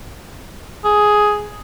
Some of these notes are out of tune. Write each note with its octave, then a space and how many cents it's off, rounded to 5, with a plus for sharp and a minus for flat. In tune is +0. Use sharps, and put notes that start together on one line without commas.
G#4 +5